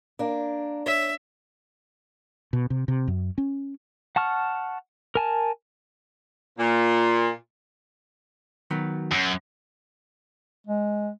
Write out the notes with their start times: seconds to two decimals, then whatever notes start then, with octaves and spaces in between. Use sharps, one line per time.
0.19 A#3 D4
0.86 C#5 E5
2.53 B2
2.70 C3
2.88 C3
3.08 F#2
3.38 C#4
4.16 F#5 A5 C#6 F6
5.15 A#4 G#5 A5
6.58 A#2
8.71 D#3 F#3 B3
9.11 F#2
10.67 G#3